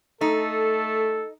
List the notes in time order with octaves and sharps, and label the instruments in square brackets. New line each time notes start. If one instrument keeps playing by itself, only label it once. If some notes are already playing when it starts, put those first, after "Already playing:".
[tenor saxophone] A3 [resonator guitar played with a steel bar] D#4 [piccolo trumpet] A4